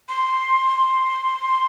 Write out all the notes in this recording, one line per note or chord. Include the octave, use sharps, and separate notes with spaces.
C6